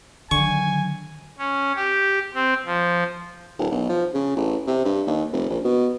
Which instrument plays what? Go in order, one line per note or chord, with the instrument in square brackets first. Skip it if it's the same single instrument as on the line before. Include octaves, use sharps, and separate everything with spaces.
[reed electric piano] D3 [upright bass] D#3 F#3 [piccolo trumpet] G#5 [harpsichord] C#6
[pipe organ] C#4
G4
C4
F3
[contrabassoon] D1
B1
F3
C#3
A1
C3
G2
D#2
F1
A#1
B2